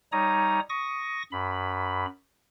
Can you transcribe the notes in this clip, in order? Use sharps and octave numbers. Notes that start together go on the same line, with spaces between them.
G3 D#4 C#5 A#5 D#6
C#6 D#6 A#6
F#2 B5